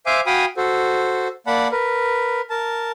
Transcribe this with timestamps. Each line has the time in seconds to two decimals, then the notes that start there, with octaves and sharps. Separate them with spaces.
0.06 C5 E5 F5 G#5 D6
0.26 F#4 F5 G5 G#5 B5 D#6
0.57 F#4 A4 C5
1.47 A#3 D5 F#5 A5 B5
1.71 A#4 B4
2.50 A#4 A5